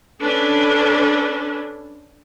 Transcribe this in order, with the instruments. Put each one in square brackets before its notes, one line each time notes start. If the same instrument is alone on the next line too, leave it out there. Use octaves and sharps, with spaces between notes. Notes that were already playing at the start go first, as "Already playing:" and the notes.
[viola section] C#4 D4 A4 B4